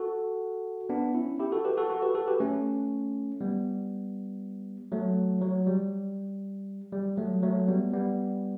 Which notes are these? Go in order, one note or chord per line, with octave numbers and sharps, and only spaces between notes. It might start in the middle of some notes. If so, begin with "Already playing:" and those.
Already playing: F#4 A4
B3 D4
C#4 E4
E4 G4
F#4 A4
G4 B4
F#4 A4
F#4 A4
G4 B4
F#4 A4
G4 B4
A3 C#4
G3 B3
F#3 A3
F#3
G3
G3
F#3 A3
F#3 A3
G3 B3
G3 B3